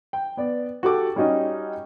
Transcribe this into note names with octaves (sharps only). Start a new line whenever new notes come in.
G5
B3 D5
F#4 G4 A4 D6
G3 C#4 D#4 F#4 D#5